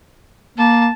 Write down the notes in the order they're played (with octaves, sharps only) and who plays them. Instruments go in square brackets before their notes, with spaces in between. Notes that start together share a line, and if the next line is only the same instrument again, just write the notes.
[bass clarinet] A#3 [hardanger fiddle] A5